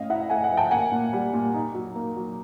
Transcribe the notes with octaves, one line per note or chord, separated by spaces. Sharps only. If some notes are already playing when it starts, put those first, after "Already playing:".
Already playing: A2 C#4 D#5 F5
E4 E5 F#5
A3 F#5 G#5
F#5 G#5
F3
G5 A5
A#3 F#5 G#5
A#2
G3
A#2
D#4
F#3
A#3
F#3